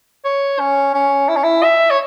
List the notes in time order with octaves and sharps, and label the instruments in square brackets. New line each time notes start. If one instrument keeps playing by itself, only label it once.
[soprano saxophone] C#5
C#4
C#4
E4
C#4
E4
E5
C#5